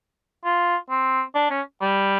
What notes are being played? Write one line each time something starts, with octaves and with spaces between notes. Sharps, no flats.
F4
C4
D4
C#4
G3